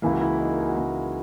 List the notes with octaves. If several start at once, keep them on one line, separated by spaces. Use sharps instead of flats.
C#2 C#3 E3 A#3 E4
F#4
E4
D#4
A#4
G#4
F#4
C#2 C#3 E3 A#3 E4